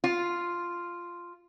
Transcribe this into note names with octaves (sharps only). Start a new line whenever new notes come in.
F4